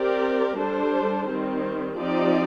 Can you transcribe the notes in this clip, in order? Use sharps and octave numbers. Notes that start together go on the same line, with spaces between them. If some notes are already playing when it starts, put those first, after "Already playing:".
Already playing: C4 G4 A#4 D5
G3 D4 A4 C5
D#3 G3 C4
F3 C4 D#4 G4 D5